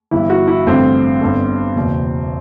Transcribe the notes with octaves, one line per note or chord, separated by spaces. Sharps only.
G1 G2 E3 E4
F#4
E4
A1 G2 D3 C4
G1 G2 D3
F#1 E2 B2